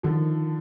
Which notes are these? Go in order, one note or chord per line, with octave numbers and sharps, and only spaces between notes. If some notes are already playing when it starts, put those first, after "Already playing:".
D3 D#3 F3